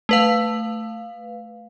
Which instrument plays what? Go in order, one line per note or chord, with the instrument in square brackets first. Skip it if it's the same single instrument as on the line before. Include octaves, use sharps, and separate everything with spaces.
[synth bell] A3 B4 F5